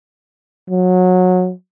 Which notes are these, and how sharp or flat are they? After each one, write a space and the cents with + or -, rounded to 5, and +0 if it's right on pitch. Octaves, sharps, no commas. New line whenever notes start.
F#3 -20